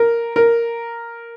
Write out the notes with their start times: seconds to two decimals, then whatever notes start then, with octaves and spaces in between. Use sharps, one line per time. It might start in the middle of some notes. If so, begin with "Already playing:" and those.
Already playing: A#4
0.36 A#4